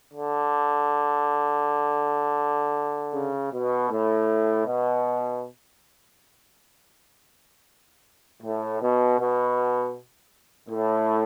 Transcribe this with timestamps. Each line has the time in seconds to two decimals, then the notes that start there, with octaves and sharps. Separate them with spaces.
0.11 D3
3.13 C#3
3.51 B2
3.89 A2
4.64 B2
8.42 A2
8.80 B2
9.18 B2
10.69 A2